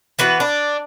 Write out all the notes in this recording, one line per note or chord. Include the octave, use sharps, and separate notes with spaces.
E3 B3 F#4 B4
D4